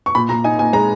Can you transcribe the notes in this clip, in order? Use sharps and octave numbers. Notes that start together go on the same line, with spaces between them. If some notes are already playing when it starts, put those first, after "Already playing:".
C#6
A#2 B5
A#2 A#5
D#4 G#5
A#2 G#5
G#3 A#5